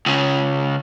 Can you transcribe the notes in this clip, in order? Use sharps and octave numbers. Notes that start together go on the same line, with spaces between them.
C#2 C#3